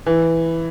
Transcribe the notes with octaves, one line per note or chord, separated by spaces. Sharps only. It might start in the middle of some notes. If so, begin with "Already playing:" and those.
E3